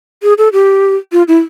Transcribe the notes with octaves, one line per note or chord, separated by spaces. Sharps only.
G#4
A4
G4
F4
E4